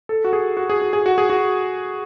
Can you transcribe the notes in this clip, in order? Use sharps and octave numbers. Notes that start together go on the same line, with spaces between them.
A4
F#4
G#4
F#4
G#4
F#4
G#4
F#4
G#4
F#4